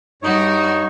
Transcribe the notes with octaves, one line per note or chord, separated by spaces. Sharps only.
G2 G3 D#4 F#4 C#5